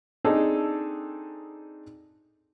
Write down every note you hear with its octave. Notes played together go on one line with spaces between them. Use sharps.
C4 D4 D#4 G#4 A4